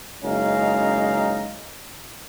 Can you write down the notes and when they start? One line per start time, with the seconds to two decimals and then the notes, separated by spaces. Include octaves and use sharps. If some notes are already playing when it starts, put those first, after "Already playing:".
0.24 F#1 G#3 C#4 D#4 F5 A#5